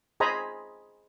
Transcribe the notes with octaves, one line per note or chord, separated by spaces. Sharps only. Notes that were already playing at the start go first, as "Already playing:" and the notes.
G#4 C5 D#5 G#5 A#5 B5